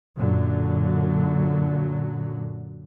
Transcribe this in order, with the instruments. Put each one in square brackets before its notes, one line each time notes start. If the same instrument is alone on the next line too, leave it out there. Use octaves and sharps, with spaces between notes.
[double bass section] F#2 A#2 D3 F#3